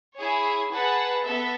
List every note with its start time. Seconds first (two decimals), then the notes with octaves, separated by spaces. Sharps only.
0.18 E4 G#4 C#5 G#5
0.72 G#4 B4 F#5 A5
1.26 B3 A4 E5